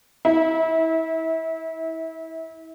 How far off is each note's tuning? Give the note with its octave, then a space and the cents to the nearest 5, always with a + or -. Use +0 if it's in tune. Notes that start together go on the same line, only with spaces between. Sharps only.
E4 -20